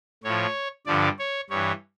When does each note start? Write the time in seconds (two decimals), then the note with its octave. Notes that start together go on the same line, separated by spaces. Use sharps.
0.23 A2 F3 C#5
0.86 G2 D3 F3 D5
1.19 C#5
1.50 G2 E3 C#5